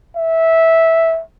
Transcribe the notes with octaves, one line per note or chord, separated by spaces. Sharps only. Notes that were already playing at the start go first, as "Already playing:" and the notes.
E5